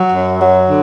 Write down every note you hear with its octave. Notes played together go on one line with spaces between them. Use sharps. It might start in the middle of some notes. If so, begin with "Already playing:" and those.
Already playing: F#3
F#2
F#3
D3